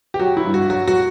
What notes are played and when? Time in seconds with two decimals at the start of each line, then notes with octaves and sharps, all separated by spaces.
0.14 G4
0.20 F#3 F#4
0.37 E4
0.45 G2
0.54 F#4
0.70 F#3 F#4
0.88 F#4